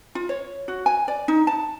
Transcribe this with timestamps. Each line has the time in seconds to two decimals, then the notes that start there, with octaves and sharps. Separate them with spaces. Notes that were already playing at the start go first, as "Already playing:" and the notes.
0.15 F4
0.29 C#5
0.68 F#4
0.86 G#5
1.08 D5
1.28 D#4
1.47 A5